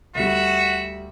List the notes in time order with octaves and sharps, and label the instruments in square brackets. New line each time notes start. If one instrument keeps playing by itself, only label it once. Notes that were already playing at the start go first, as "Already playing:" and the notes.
[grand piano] D2 G3 [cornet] F#4 [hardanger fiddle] E5